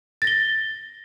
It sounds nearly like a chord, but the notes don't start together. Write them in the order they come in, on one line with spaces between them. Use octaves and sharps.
A6 A#6 G7